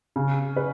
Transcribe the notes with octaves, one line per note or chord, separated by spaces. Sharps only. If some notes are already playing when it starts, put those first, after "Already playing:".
C#3
B4